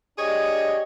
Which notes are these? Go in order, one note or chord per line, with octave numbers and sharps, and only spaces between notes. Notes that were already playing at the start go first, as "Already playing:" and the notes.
D4 G4 G#4 C#5 D#5